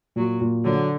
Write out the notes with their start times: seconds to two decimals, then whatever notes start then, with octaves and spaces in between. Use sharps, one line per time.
0.16 A#2 F#3
0.41 A#2
0.65 D3 F#3